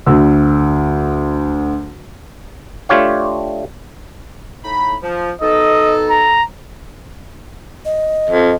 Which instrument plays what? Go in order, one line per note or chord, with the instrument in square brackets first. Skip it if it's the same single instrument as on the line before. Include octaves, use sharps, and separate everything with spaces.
[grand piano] D2 D3 E6
[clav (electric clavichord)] A3 D4 F4 G4 C#5 F5
[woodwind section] A2 D#4 B5
F3
[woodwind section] B2 D#4 A4 [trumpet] D#5
[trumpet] A#5
[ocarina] D#5
[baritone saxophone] F2